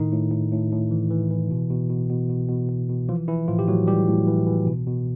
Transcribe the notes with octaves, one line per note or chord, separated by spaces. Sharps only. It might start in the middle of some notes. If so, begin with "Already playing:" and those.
Already playing: A2 D#3 D#4
A2
A2
A2
A2
E3
E3
E3
B2
B2
B2
B2
B2
B2
B2
B2
E3 F3 F4
E3 E4
A2 F3 F4
G4
A2 F#3 F#4
E3 G3 G4
A2
E3
E3
B2
B2